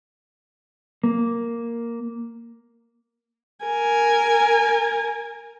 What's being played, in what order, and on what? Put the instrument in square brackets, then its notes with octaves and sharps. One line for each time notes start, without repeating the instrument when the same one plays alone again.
[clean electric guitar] A#3
[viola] A#4 G#5